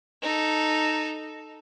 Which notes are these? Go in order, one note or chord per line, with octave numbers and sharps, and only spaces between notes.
D#4 A4